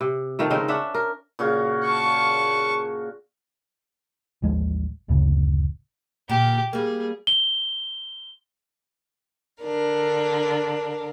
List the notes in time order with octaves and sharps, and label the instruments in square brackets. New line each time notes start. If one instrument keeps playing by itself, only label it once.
[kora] C3
D#3 F3 A3
C#3 G#3 C4 D#4
C#4 D4 E5 F#5
A#4
[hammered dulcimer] A#2 C#3 F#4
[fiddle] A5 C#6
[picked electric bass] A1 D#2 F3 G#3
F#1 D2 A2 C#3
[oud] A#2 D3 [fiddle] G4
[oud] G3 A#3 [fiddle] G#4
[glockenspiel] G7
[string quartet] D3 D4 A#4